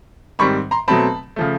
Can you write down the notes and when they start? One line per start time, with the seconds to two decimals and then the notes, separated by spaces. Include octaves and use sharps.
0.39 G#2 D#3 G3 C4 B5 C#6
0.71 A#5 C6
0.88 B2 F#3 A3 C4 A5 B5
1.36 C#3 F3 A3